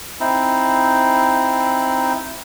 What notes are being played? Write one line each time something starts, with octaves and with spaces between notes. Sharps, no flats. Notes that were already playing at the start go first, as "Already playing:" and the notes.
C4 D#4 E4